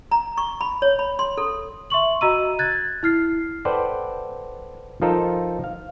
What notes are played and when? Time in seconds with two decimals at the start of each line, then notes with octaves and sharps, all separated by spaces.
0.11 A#5
0.38 C#6
0.61 B5
0.82 C#5
0.99 B5
1.19 C6
1.37 A4
1.90 E5 C6 C#6 F#7
2.21 F#4 D#5 A#5 E6 D#7
2.59 F#6 G#6 A6
3.03 E4 F6 C7
3.65 A4 B4 C5 D5 F#5 G5
5.02 F3 D#4 F4 A4 A#4 C5
5.64 F5